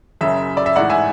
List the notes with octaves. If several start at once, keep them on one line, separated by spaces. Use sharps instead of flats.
F#1 F#2 C#3 E5
D5
E5
A1 G#2 E3 D5 F#5
E5 G#5